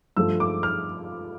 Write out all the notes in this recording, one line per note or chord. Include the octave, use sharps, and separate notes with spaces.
G2 F3 A3 E6
D6
F6